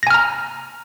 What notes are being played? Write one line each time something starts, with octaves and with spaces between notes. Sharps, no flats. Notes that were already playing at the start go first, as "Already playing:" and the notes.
G#5 A#5 F6 A#6